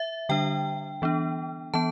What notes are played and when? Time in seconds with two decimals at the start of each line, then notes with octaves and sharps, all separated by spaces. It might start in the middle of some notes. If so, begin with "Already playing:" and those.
Already playing: E5
0.29 D3 G3 D4 G5
1.02 E3 B3 D4
1.74 E3 B3 A5